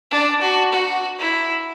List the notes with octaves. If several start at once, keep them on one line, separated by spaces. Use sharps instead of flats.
D4
F#4
F#4
E4